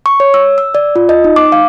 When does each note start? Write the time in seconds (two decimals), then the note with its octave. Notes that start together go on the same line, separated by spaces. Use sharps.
0.06 C#6
0.20 C#5
0.34 E6
0.58 E6
0.75 D5
0.96 F4
1.09 D#5
1.24 D#4
1.36 D6
1.52 F5